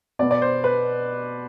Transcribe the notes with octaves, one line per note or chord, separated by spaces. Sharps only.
B2 B3 D5
D5
C5
B4